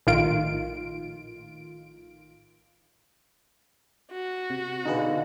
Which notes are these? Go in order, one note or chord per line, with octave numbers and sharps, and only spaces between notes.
A#1 A2 D#3 F4 D7
F#4
C3
B2 D3 D4 D#4 G#4 B4 D#5 F5